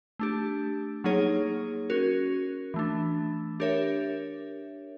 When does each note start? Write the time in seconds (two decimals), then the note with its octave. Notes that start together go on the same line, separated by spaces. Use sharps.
0.19 A3 D4 G4
1.04 F#3 A#3 D#4 G#4 C#5
1.90 C#4 F#4 A#4
2.74 E3 A3 D4
3.60 D4 G4 A#4 C#5 E5